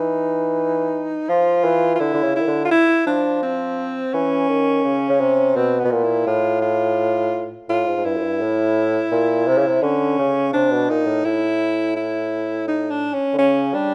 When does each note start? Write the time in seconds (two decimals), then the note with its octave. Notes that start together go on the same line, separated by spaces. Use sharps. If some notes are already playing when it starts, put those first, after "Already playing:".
Already playing: E3 D#4
1.29 F3 F4
1.64 E3
1.95 F4
2.00 D3 E4
2.14 D3
2.23 C#3
2.36 D#3 E4
2.47 D3
2.65 F4
2.71 E4
3.07 F3 D4
3.43 C4
4.13 E3 C#4
4.48 D#3
4.84 C#3
5.09 C#3
5.20 C3
5.56 B2 C4
5.80 B2 B3
5.91 A#2
6.03 E4
6.27 A2 F4
6.62 F4
7.69 A2 F4
7.87 G#2
7.97 G#2
8.04 G2 E4
8.17 F#2
8.22 G2
8.41 A2
9.11 A#2
9.47 C3
9.57 C#3
9.67 C3
9.82 D3 C#4
10.19 C#3
10.53 C3 D4
10.71 B2
10.90 A#2 D#4
11.06 A2
11.25 A2 E4
11.96 E4
12.68 D#4
12.90 D4
13.14 C#4
13.33 D3
13.38 C#3 C#4
13.74 G3 D4